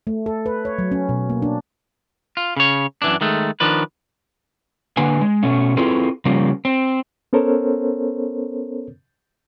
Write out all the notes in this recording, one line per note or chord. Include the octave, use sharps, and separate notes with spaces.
A3
A4
B4
C#5
F#3
C#4
B2
A#3
D4
F4
C#3 C#5
F#2 E3 D4
D#3 G#3 A3
D#3 F3 D4 B4
D3 A#3 D4 B4 G#5
G#3
B2 A3 C#4
C4 E4 F4 G#4 A4 B4
C#3 F3 G3 A#3
C4
B3 C#4 A4 A#4 C5 C#5